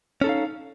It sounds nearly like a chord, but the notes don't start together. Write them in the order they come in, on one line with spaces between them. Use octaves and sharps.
C#4 A4 D#4 F5